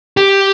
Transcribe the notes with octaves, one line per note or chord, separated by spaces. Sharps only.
G4